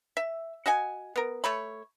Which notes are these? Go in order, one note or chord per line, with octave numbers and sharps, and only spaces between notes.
E5
F#4 D#5 F#5 G#5
B3 A#4
A3 C#5 B5